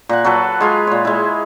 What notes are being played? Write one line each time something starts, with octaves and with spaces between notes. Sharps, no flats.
A#2 F#5
F#3 F#4 A4 B4
G#3 F4 G#5
A#2 C#5
G#3 E4